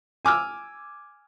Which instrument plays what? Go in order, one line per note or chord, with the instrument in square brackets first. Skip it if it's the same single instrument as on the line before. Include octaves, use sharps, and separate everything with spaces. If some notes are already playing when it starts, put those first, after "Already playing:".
[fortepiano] G#5 D6 E6 F6